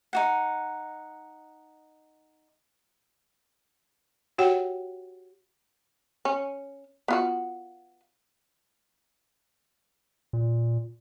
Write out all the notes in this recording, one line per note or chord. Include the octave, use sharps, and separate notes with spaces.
D#4 F#4 F#5
F#4 G4 C#5 F#5 G5
C#4
B3 F4 F#4
A#2